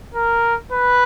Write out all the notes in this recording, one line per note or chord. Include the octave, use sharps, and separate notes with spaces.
A#4
B4